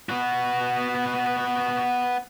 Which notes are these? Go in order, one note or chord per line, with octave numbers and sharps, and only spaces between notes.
B3 F#4